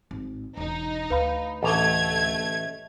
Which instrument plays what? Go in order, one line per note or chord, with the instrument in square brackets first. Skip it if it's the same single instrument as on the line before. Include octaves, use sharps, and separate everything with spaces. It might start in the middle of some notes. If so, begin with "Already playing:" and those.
[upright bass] G#1
[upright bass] E1 [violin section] D#4
[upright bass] D2 [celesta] B4 F5 B5
[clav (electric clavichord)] A1 [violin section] A3 G#6 [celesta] D#5 F7